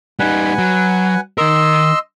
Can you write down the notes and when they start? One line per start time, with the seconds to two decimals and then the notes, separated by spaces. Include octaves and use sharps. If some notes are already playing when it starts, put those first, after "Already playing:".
0.19 G3 D#4 B4 F#5 G#5
0.58 F#3
1.38 D#3 A#4 D#5 C6 E6